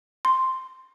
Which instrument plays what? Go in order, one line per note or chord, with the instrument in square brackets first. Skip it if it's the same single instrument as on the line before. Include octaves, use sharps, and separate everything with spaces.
[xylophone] C6